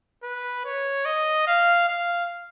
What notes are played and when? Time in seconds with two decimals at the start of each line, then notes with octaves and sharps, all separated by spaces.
0.23 B4
0.65 C#5
1.05 D#5
1.47 F5
1.89 F5